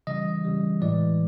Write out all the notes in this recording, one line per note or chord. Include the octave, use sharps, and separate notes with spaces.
C#3 E3 G3 D#5
C#3 E3 G3
A2 E3 G#3 D5